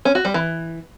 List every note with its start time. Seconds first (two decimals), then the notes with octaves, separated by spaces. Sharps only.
0.05 C#4
0.15 F#4
0.25 G3
0.34 E3